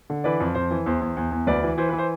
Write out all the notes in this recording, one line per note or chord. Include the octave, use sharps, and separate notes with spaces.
D3
E3 B4 D5
F2
F2 C5
E3
E2 C5
E2
E2
E2
D2 B4 D5
E3
E3 C5
B4
E3
C5